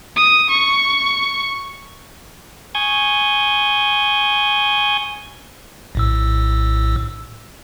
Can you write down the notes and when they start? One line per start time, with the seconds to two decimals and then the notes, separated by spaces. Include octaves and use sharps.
0.16 D#6
0.50 C#6
2.75 G#5 C#6 D#6 G6 G#6
5.95 A#1 A2 E6